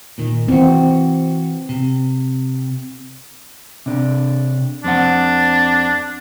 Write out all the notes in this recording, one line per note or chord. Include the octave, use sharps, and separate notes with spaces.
A#2 D#3
E3 C4 F#4
C3
C3 D4
F2 C4 D4 F#5